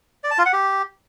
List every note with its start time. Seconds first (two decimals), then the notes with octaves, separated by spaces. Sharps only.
0.24 D5
0.31 A5
0.38 F4
0.46 F#5
0.53 G4